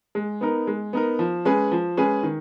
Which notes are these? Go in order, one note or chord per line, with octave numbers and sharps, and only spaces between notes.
G#3
B3 D#4 A#4
G#3
B3 D#4 A#4
F3
G#3 C#4 G#4 B4
F3
G#3 C#4 G#4 B4
D#3